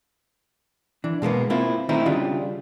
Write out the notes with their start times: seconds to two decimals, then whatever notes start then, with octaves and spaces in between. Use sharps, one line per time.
1.04 E3 D4
1.22 B2 G#3 A#3 B3
1.50 A#3 C4 E4 F4
1.89 D#3 A3 C4 D#4 E4
2.06 C#3 G3 D4 F4